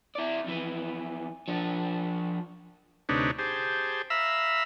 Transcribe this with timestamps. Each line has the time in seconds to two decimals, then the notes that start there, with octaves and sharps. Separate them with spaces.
0.15 E4 D5
0.44 F2 E3
1.48 F3 D4
3.09 D2 C3 D4 D#4 B4 C#5
3.39 G4 G#4 C5 A5
4.10 E5 F5 A#5 B5 E6